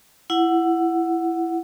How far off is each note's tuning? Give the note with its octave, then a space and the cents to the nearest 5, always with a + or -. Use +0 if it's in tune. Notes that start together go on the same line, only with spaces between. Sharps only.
E4 +15 F#5 +0